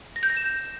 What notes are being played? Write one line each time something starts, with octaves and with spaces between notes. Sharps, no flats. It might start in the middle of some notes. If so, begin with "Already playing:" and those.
A#6
G6
A#6
E7